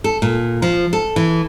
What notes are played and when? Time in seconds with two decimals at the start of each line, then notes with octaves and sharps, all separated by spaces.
0.04 A4
0.22 A#2
0.62 F3
0.93 A4
1.16 E3